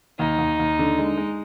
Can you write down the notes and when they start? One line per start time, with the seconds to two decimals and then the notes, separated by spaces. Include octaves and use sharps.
0.19 D#2 D#4
0.38 D#2
0.59 D#2
0.79 D3
0.99 G#3
1.17 G#3